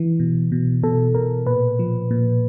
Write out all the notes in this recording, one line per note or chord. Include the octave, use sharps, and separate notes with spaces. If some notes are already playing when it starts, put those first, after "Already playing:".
Already playing: E3
B2
B2
B2 A4
B2 A#4
A#2 B4
F3
A#2